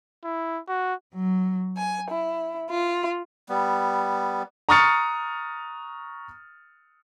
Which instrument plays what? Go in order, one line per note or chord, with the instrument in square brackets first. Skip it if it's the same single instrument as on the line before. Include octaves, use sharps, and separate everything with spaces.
[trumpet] E4
F#4
[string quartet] F#3
G#5
E4
F4
[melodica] G3 B3
[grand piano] A#5 C#6 D#6 F6 A6 C#7